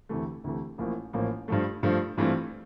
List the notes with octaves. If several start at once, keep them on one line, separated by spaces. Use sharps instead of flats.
D2 C3 E3 A3
D2 C3 E3 A3
A1 A2 F3 A#3
A1 A2 F3 A#3
G2 F3 A3
G2 F3 A3
G2 E3 A3 C4 F4